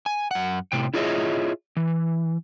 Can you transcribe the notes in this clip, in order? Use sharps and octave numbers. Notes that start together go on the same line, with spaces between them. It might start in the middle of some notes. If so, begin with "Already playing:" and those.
G#5
F#2 F#5
A2 C3 G5
E4 F4 G#4 C#5 D#5 E5
E3